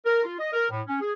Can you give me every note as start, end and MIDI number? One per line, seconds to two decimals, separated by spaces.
0.05 0.22 70
0.24 0.38 65
0.39 0.51 75
0.53 0.68 70
0.70 0.81 45
0.87 0.98 61
1.00 1.12 68